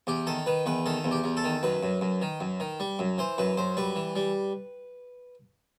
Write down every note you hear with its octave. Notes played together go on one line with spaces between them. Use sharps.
E2 G4
D#3 A4
D#3 B4
E2 B4
D#3 A4
E2
G4
E2
A4
D#3
F#2 B4
F#2
F#2
D#3
F#2
D#3
G3
F#2
E3 C5
F#2 B4
F#2 C5
G3 B4
E3
G3